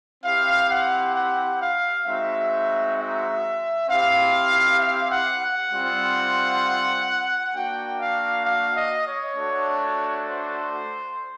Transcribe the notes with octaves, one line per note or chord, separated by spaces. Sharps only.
C4 E4 G4 F5
F#5
F#5
F5
G#3 C4 D#4 F#4 E5
E5
C4 E4 G4 F5
F5
F#5
F#5
G3 C4 F4
A#3 D4 F#4 G5
F5
F5
D#5
C#5
A3 D4 F#4
C5